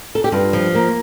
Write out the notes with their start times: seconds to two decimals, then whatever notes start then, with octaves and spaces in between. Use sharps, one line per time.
0.15 A4
0.24 G4
0.32 G2 F4
0.53 F3
0.75 A#3